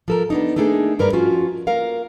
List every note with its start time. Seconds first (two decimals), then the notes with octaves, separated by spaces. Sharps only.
0.08 F3 A4 A#4
0.30 B3 D4 D#4
0.56 A3 A#3 D4 D#4 G4 G#4
0.99 G2 A#4 B4 D5 A#5
1.13 F3 C#4 F4 F#4
1.67 A#3 A#4 F5